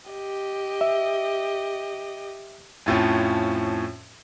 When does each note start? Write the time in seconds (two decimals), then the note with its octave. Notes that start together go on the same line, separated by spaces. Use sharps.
0.10 G4 D#5
0.81 E5
2.86 F2 A2 F3 C#4